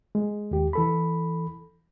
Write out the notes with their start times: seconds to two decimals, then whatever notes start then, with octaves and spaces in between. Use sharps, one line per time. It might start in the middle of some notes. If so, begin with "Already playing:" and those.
0.15 G#3
0.51 D#2 G4
0.73 E3 A4 B5